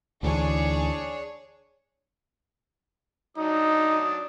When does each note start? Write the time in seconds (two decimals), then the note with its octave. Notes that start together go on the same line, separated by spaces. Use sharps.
0.23 D2 D3 E3 D4 G#4 C#5
3.37 F#3 D4 D#4 D#6